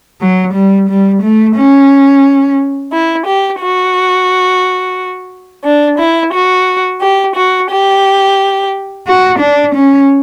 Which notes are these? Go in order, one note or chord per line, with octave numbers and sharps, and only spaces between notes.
F#3
G3
G3
A3
C#4
E4
G4
F#4
D4
E4
F#4
G4
F#4
G4
F#4
D4
C#4